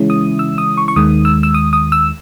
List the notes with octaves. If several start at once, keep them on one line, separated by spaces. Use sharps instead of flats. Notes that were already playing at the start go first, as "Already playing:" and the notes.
Already playing: C#3 E3 G#3 C#4 E4
D#6
E6
D#6
C#6
C#6
D#2 D#3 G#3 D#6
E6
E6
D#6
D#6
E6